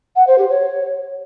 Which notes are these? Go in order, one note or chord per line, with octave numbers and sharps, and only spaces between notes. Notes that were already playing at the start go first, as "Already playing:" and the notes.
F#5
C5
G4
C#5